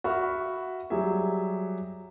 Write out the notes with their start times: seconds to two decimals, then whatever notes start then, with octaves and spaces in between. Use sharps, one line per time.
0.04 F#4 E5 B5 F6
0.90 F#3 G3 G4 G#4 E5